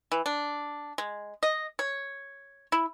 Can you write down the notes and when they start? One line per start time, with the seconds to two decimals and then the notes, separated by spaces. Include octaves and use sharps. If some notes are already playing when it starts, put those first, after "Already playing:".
0.12 E3
0.26 D4
0.98 G#3
1.43 D#5
1.79 C#5
2.72 E4